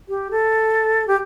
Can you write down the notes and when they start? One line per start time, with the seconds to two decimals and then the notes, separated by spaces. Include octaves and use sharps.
0.09 G4
0.31 A4
1.07 G4